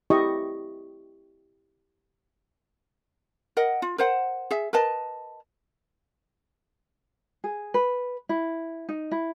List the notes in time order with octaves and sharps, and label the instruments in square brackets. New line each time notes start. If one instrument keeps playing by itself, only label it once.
[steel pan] E4 G4 D#5 C#6
[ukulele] A#4 D#5 F#5
F4
A#4 C5 F#5
G#4 E5
A#4 B4 D#5 A5
G#4
B4
E4
D#4
E4